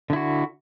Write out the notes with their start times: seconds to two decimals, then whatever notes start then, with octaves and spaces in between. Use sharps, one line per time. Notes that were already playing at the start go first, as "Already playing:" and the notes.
0.10 D3
0.13 E4
0.16 F#4